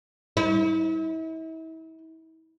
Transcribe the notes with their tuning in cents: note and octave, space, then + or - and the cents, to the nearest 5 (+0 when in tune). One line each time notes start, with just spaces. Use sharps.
E4 -40